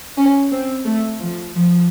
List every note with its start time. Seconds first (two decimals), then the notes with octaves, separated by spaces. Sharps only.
0.17 C#4
0.51 C4
0.85 A3
1.20 F3
1.53 F3